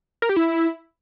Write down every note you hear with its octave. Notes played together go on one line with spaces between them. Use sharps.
A#4
G4
E4